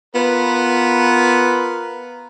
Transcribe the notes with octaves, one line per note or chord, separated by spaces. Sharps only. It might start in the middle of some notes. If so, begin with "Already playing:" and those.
B3 F4 A#4 B4